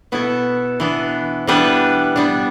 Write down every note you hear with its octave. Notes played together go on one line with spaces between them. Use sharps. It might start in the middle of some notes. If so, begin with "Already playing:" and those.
B2 B3 E4 A4 E5
E3 B3 D4
E3 G3 B3 D4 B4
G3 B3 D4